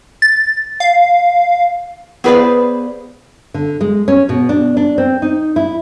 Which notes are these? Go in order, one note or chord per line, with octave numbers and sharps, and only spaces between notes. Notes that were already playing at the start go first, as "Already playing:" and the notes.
A6
F5
B3 G#4 B4 C5 D5 F5
D3
G#3
C#4
B2
D4
D4
C4
D#4
E4